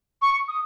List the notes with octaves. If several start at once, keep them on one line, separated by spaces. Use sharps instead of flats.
C#6
D#6